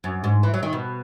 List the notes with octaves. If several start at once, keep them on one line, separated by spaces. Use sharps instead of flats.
F#2
G#2
E3
F#3
D#3
B2